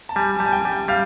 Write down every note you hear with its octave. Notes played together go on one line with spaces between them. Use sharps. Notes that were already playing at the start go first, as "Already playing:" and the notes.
A5
G3 G#5
G3 A5
G#5
G5
G3
G3 F5